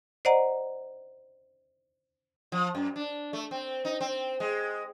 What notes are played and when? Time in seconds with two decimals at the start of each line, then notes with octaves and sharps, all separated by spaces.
0.25 C5 D5 D#5 F#5 A#5
2.52 F3
2.75 F#2
2.96 D4
3.33 A3
3.51 C4
3.85 D#4
4.01 C4
4.40 G#3